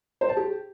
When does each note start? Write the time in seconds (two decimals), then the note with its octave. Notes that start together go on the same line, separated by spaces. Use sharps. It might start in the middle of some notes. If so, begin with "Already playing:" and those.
0.21 C5
0.29 A5
0.37 G4